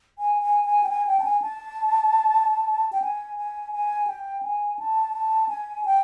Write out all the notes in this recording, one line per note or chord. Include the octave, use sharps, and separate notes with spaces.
G#5
G#5
G#5
G5
G#5
G5
A5
G#5
A5
G5
G#5
G#5
G#5
G5
G#5
A5
A5
G#5
G5